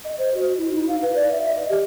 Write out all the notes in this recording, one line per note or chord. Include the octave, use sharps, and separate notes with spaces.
D#5
C5
F#4
E4
D#4
F5
B4
D5
E5
D#5
G4